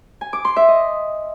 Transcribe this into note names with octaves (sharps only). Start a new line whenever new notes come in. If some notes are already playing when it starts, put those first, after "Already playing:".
G#5
D6
C6
E5
D#5